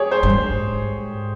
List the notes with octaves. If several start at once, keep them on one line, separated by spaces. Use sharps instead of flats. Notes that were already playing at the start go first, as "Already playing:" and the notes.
Already playing: G4 G#4 C#5
C5
G2
G#2